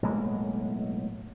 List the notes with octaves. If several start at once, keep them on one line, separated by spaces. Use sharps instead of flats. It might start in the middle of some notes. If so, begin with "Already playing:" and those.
B1 A2 G#3 A#3